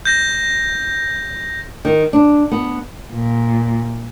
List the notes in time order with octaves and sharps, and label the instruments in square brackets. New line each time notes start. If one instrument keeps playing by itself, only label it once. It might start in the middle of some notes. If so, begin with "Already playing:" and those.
[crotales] G6 A#6
[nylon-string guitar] D#3
D4
B3
[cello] A#2